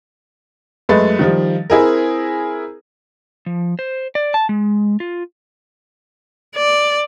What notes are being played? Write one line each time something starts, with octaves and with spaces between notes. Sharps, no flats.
F#2 G#3 A3 B4 A6
D#3 F3 G3
C4 E4 G#4 A#4
F3
C5
D5
A5
G#3
F4
D5